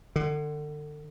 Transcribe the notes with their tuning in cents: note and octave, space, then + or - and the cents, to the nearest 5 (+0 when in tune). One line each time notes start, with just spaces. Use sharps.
D3 +35